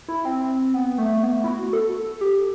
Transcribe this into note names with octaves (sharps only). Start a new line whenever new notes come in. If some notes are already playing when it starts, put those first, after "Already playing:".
E4
C4
B3
A3
B3
E4
F#4
A4
G4